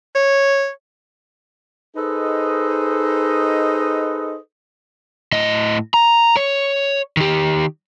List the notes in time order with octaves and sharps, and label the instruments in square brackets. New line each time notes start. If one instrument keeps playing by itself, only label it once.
[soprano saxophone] C#5
[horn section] D#4 G#4 A4 B4 C5 D#5
[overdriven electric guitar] A2 D#5
A#5
C#5
D#3 G4